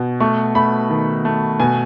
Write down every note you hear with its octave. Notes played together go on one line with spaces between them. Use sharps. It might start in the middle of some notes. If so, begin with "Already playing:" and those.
Already playing: B2
A3 C#6
A3 B5
D#3
A3
B2 G#5